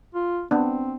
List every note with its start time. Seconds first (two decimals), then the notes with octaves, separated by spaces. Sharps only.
0.15 F4
0.51 B3 C4 D4